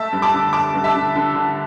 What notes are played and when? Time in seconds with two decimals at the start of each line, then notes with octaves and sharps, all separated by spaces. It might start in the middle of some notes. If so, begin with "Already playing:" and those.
Already playing: A3 E5 A5
0.13 G2
0.22 A5 D6
0.33 D3
0.53 A3 A5 D6
0.75 G2
0.84 E5 A5
0.95 D3
1.15 D3
1.35 D3